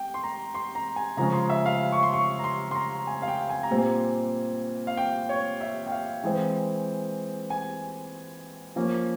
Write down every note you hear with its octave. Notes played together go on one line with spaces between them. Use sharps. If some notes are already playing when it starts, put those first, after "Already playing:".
Already playing: G5
C6
A#5
C6
A#5
G#5
C#3 F3 G#3 C#4 A#5
C6
E5
F5
C#6
C6
C#6
A#5
C6
C6
A#5
G#5
F5
G5
G#5
A#5
A#2 G3 C4
G#5
F5
G5
C#5
E5
G5
F5
E3 G#3 C4 G5
G#5
F3 A#3 C#4